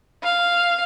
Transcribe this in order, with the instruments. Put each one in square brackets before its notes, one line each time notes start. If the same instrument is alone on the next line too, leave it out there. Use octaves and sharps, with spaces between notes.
[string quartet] F5